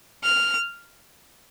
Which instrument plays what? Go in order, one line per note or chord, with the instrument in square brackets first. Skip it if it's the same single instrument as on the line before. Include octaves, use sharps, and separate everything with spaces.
[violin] F6